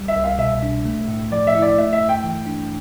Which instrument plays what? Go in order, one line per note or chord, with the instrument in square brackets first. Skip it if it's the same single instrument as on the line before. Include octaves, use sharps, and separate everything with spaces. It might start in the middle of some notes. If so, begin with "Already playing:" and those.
Already playing: [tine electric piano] C2 G3
[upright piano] E5
[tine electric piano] C2
[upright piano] F5
[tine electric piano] B2 [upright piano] E5
[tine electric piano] D4
A3
A2
[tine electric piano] F3 [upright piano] D5
[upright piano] E5
[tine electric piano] E4
[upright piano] D5
[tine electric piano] A3 [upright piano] E5
[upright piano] E5
[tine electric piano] G2
[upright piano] G5
[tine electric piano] E3
D4